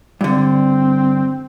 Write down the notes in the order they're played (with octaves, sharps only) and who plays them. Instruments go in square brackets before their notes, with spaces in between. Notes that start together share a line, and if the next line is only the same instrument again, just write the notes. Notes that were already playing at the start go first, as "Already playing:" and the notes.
[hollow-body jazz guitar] G2 D3 [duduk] C4